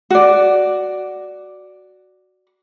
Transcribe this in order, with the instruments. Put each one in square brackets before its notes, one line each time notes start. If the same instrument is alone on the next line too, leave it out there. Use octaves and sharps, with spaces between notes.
[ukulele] F#4 D5